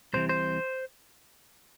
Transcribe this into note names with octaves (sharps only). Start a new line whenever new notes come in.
C2 C3 E3 C5
C5